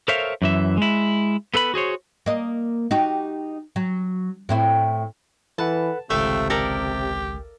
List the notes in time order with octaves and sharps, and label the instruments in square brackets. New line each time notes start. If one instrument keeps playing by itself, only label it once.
[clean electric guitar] A4 A#4 C5 C#5 E5 F5
F#2 E3 E5
G#3 E4
B3 A4 B4 B5
F#4 G#4 C5 C#5
[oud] A#3 D#5
D#4 F#4 G4
F#3
A2 C4 E4
[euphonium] E3 [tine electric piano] A4 B4 F#5 [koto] A5
[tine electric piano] G#1 C#2 [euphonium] C3 [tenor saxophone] A3 [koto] E5 F5 G5
[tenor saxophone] G4 [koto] A4 A#4 D5